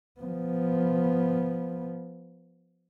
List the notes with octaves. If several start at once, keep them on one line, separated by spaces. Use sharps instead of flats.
F3 B3